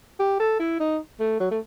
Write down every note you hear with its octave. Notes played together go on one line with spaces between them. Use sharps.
G4
A4
E4
D#4
A3
F#3
A3